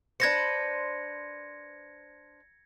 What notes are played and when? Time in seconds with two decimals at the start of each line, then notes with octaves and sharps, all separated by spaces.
0.20 D4 B4 C5 G#6 A#6 C#7